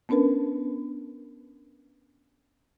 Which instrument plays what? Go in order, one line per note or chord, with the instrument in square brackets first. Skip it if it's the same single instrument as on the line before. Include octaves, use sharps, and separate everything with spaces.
[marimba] B3 C#4 D4 A#4 B4